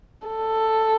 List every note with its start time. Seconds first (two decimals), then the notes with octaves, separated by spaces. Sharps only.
0.27 A4